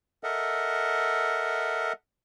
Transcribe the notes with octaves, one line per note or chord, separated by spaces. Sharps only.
A4 A#4 D#5 E5 F#5